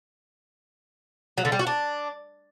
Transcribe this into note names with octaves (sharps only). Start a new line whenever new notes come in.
F#3
D3
G3
F#4
D4